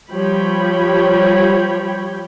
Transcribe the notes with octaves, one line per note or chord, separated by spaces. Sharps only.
F3 G3 C#5 G5 B5